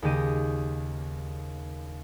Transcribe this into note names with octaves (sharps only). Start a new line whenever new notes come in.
D#2 C#3 G4 D#5 D#7